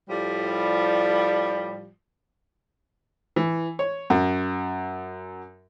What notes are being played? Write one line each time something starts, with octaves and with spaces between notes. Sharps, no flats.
A2 F3 G3
E3
C#5
F#2